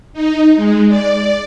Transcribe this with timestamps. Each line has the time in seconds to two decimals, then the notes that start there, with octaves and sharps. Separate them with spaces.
0.13 D#4
0.56 G#3
0.88 D5